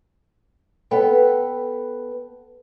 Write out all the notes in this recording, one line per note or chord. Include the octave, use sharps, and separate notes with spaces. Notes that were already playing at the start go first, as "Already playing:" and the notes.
B3 A4 B4 G5